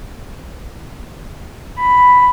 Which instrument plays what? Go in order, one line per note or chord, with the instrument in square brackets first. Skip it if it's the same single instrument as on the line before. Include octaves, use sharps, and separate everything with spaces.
[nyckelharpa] B5